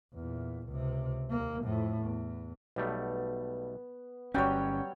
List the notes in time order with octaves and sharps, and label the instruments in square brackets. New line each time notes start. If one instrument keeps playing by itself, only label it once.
[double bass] E2 A#2
C#2 C3
D#2 A#3
F2 A2
E2
[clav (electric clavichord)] B1 G3 A3 [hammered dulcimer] B3
[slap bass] G1 C#4 [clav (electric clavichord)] F#3 G3 F#4 [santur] C#5 G5